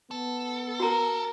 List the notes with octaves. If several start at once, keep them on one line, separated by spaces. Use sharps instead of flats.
B3 A4
F#4 A#4 A#5